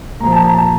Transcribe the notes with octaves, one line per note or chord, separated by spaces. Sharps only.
A#2 F3 A#5
A5
A#5
A5